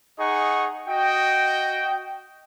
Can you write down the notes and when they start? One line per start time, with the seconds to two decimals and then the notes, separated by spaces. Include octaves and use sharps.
0.19 D#4 G#4 D#5 F#5 C#6
0.88 F#4 D#5 G5